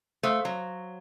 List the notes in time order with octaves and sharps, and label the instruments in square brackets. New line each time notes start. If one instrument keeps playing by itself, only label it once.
[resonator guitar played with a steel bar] A3 [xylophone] C5 F5 C6 D#6 F#6
[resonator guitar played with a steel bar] F#3